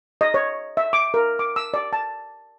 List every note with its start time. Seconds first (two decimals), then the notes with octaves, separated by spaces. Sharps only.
0.21 D#5
0.34 C#5
0.77 E5
0.93 D6
1.14 A#4
1.39 D6
1.56 E6
1.74 D5
1.93 A5